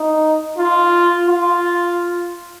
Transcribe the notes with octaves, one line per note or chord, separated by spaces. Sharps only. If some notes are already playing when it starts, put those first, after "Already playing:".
Already playing: D#4
F4
F4